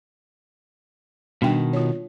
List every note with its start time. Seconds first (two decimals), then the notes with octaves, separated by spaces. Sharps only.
1.42 B2 D#3 G3 D4 G5
1.73 F4 C#5